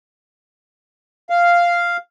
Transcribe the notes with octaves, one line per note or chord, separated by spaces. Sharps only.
F5